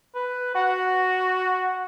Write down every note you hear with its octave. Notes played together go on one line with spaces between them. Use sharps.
B4
F#4 F#5